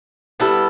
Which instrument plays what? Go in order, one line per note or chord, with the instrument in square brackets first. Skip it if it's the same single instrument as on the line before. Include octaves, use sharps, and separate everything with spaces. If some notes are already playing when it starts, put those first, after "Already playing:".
[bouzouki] G3 B3 E4 A4